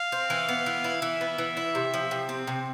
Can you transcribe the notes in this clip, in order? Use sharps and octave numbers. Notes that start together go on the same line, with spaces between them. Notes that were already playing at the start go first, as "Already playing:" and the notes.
Already playing: F5
C4
E3
B3
E3
E4
E3 E5
B3
E3
E4
C3
F3
C3
C4
C3